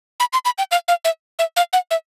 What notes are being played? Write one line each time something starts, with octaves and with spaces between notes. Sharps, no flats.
B5
C6
B5
G5
F5
F5
E5
E5
F5
F#5
E5